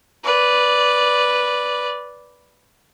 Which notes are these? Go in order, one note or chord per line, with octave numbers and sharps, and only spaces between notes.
B4 D5